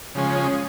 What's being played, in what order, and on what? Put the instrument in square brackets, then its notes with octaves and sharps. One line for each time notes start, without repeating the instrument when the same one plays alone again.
[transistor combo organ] C#3 F3 G#3 C#4